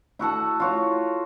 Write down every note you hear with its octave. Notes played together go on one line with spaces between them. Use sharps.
E4 F#4 A4 F#5
F4 F#4 C#5